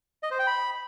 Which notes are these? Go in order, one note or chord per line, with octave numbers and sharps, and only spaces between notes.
D#5
C5
G5
B5